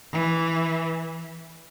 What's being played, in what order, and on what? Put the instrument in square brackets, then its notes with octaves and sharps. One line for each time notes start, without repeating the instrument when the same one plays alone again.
[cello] E3